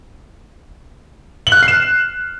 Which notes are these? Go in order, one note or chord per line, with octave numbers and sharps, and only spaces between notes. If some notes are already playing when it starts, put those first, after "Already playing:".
F#7
F#6
F6
C7
E7